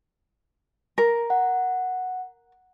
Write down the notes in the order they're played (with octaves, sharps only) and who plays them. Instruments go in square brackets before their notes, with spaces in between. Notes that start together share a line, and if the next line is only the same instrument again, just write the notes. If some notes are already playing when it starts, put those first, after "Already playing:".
[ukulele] A#4
[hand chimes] F#5